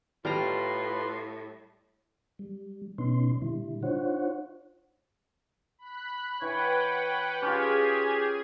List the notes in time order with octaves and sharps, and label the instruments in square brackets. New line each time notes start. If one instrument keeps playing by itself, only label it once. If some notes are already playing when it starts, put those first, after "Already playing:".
[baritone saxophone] A2 [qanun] G3 A#5 [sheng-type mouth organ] F4 B4 C6
[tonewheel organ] G3
B2 B3 C#4 D#4 C6
A#2 D3 G3 E4
D4 D#4 F4 C5 C#5 F#5
[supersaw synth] B5 F#6
[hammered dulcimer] E3 [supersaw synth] B4 F#5 G5 [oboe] C#5
[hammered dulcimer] C#4 F4 [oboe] G4 [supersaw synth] G#4 G#6